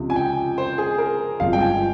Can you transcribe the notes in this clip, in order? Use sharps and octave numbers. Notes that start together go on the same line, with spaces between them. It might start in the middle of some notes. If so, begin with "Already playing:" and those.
Already playing: C#2 C3 F3
G#5
G5
C5
G#4
A#4
G1 G2 F3 G#3 C4 F5
G5
G#5